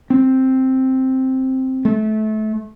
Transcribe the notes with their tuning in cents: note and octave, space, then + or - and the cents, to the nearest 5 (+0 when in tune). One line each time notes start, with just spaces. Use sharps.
C4 +5
A3 -25